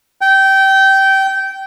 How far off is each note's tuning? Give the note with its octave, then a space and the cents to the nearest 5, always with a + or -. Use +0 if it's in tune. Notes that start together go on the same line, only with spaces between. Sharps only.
G5 -20